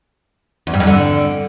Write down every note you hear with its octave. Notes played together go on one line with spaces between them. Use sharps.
E2
G2
F2
D3